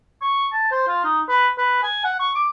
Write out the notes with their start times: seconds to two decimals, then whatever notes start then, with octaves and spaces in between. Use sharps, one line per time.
0.22 C#6
0.52 A5
0.71 C5
0.88 F4
1.04 D#4
1.29 B4
1.58 B4
1.83 G#5
2.04 F#5
2.20 C#6
2.35 D6